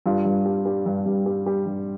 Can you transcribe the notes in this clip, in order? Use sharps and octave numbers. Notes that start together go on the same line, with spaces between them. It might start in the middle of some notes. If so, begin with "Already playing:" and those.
G2 F4
G2
G3
G3
G2
G2
G3
G3
G2